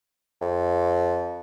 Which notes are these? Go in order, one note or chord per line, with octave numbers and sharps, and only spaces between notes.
F2